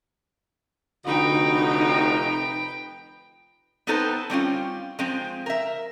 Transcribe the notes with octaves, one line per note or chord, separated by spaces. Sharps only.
F1 D3 D#4 F#4 B4 G5
B3 C4 D#4 A4 B4 C5
G3 C4 C#4 F4
F3 G#3 C4
A#4 E5